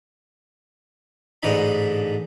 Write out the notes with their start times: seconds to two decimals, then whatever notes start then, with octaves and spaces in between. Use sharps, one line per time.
1.43 A1 G#2 D3 D#4 D5 B5